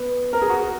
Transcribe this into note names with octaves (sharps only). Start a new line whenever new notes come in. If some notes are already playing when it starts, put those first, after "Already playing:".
Already playing: B3
A#4
G#4
F#4